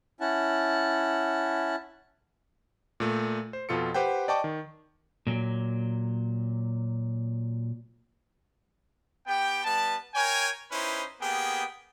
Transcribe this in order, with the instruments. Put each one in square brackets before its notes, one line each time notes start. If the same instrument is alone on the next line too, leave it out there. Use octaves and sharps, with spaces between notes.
[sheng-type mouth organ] C#4 E4 F#5 A5
[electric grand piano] A#2 A3
C5
F2 B2 F4 A4 C#7
G4 B4 C5 F#5 G5
D5 D#5 G5 A5 C#6 D6
D#3
[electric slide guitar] A#2 F#3
[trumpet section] B3 G4 G5
G3 B3 B4 A5
A#4 C#5 G5 G#5
C#4 D#4 E4 B4 C5
A#3 B3 G4 G#4 G5